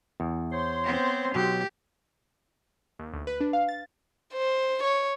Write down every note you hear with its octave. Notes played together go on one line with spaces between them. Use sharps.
E2
C5 C#5 C6
B3 C4
B2 F#3 G4
D#2
D2
B4
D4
F5
A6
C5
C#5